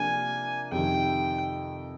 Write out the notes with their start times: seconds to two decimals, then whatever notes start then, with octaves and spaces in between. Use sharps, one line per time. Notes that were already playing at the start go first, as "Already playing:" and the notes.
Already playing: C3 F3 A#3 D4 G#5
0.72 F2 C3 D#3 G5